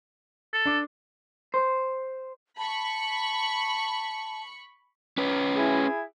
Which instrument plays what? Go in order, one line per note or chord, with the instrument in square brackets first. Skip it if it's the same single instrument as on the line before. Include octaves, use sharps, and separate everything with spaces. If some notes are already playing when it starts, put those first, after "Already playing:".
[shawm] A4
[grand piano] D4 D6
[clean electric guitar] C5
[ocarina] A5 [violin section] B5 C#6
[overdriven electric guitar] C#4 B4
[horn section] E4 G#4